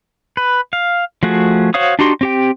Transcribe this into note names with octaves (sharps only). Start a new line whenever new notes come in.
B4
F5
F3 A3 F#4 G#4
F#4 C5 C#5 F5 D#6
D4 D#4 F#4 G4 C6
C4 G4 G5